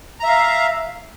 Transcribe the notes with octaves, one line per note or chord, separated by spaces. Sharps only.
E5 F5 A#5